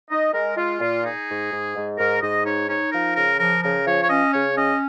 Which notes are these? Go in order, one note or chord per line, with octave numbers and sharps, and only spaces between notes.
D#4 D#5
G#3 A#4
G#3 F4
A#2 F4
D#4 G#4
G#2
G#2
G#2
G#2 A#4
G#2 D#5
D#4 C#5
D#4 C#5
F3 A#4
C#3 A#4
F3 A#4
C#3 A#4
F3 C#5
C#5
C#4 D#5
C#3 C#5
C#4 D#5